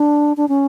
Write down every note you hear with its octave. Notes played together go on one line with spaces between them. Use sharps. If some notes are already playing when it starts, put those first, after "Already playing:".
Already playing: D4
D4
C#4